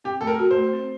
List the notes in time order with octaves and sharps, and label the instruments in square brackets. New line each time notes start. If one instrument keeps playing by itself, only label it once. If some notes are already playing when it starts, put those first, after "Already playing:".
[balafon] C4 [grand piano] G4
[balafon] A3 [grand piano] A4
[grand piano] A#4
[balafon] F#4
[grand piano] C5
[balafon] A3
C4